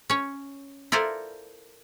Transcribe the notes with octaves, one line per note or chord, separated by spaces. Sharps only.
C#4 C#5
E4 F4 A4 A#4 C5 D5